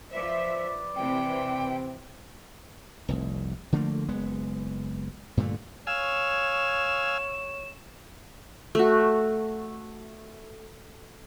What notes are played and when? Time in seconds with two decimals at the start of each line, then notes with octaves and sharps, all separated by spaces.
0.12 F3 B4 C5 D5 E5 D6
0.96 C3 E3 C4 G5
3.08 F1 C2
3.72 D3 F3 A3 A#3
4.08 F#1 G#3 B3
5.37 G2 A#2 D3 A3
5.87 C#5 F5 G#5 E6 E7
8.75 A3 F#4